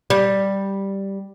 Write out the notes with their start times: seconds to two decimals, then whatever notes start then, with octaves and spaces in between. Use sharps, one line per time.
0.10 G3